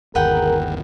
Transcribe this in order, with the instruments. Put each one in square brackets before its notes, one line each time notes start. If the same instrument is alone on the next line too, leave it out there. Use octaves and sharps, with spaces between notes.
[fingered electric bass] G1 D#2 [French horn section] G#4 A#4 [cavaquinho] B4 F#5 G5